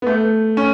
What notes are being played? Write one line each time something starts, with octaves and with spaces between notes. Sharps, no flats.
B3
A3
C#4